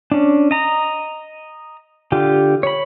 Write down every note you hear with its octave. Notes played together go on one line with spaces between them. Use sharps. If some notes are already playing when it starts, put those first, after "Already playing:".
C#4 D4
D#5 A#5
D3 F4 G4
C#5 B5